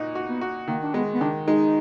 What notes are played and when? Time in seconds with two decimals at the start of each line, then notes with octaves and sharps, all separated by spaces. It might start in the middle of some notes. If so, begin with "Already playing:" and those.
Already playing: A#2 D#4 F#4
0.15 F#4
0.29 B3
0.41 F#4
0.68 D#3 A#3
0.83 D4
0.94 G#3 B3
1.14 B3
1.21 D#3 D4
1.47 G#3 D#4